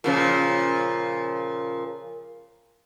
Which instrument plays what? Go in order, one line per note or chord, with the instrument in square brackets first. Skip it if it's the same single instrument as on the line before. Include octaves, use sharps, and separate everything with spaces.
[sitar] A#2 C#3 F3